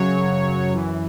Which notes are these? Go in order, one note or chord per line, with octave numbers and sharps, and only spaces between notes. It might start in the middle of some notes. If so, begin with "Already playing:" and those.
Already playing: F#2 C#3 F#3 C#5
F#2 E3